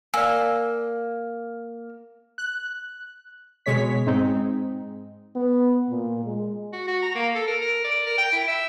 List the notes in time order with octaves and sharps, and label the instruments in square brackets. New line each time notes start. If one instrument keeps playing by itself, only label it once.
[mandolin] A#3 [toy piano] D5 G#5 [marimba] E6
[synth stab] F#6
B2 G#3 C#5 B6
G#2 G#3 C4 D#4
[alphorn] B3
A#2
G#3
[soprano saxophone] F#4
F#4
A#5
A#3
A4
A#4
A#4
D5
A#4
G5
E4
E5